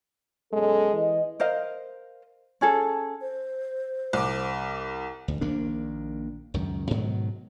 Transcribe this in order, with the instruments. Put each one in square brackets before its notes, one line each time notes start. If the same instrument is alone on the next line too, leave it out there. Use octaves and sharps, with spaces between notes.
[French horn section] F#2 B2 A4 [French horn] G#3
[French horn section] E3 D#5
[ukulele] A#4 C5 D#5 F5
C#4 G#4 A4
[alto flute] C5
[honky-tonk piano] C2 D6
[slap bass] D2
A#1 D#3 A#3 D4
C#2 F#2 D#3
G#2 B2 D#3 F#3